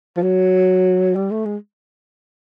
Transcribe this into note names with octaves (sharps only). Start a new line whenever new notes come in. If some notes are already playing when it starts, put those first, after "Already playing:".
F3
F#3
G3
A3
G#3